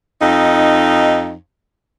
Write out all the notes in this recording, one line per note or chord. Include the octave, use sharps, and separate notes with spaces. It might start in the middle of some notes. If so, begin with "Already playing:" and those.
F2 D#4